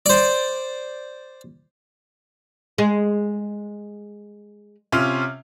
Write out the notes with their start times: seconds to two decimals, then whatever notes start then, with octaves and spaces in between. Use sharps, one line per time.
0.06 C5 D5
2.78 G#3
4.92 C3 C#4 F4